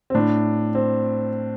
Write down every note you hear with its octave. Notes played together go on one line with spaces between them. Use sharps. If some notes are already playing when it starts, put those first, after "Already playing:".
C4
A2 D4
C4